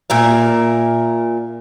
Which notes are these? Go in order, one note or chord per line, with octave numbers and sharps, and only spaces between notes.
A#2 A#4 E5